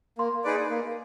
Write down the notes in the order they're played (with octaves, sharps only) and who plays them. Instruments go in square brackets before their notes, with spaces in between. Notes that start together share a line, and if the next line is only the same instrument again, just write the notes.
[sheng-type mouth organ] A#3 [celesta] C6
[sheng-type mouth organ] D#4 G#4 B4 D5
A#3